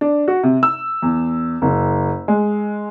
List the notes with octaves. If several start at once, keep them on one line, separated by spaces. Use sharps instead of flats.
D4
F#4
C3
E6
E2
F#1
G#3